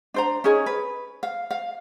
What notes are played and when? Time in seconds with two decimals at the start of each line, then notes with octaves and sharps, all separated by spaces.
0.14 D4 C5 A#5
0.44 C#4 D#4 G#4 C#5
0.66 B4
1.23 F5
1.51 F5